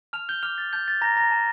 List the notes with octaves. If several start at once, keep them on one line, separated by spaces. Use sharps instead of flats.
A5 F6 F7
G6 G7
D6 F6 G6 F7
A6
A5 G6
A6
A#5 D6 G6 A#6
A#5 A#6
A5